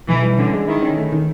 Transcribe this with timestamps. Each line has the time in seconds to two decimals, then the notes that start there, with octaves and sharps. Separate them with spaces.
0.09 B1 E3
0.23 G3
0.38 D3 C#4
0.53 G#3
0.68 D#3 E4
0.82 C#4
0.98 A3
1.12 D#3